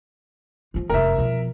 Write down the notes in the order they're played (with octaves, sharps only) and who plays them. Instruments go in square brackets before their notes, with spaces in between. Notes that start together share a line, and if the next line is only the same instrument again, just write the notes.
[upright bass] F3 F4
[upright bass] F1 F#2 [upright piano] A#4 E5
[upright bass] B2 F3